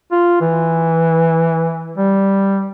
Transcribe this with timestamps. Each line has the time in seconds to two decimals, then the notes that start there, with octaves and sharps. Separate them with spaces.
0.11 F4
0.41 E3
1.97 G3